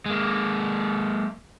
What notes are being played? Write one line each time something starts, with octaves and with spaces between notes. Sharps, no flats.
G#3 A#3